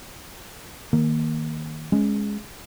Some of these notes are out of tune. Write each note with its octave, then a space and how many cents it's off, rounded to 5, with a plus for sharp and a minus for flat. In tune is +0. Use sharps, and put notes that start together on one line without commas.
D#3 +0 A#3 -5
G#3 +0 C#4 +0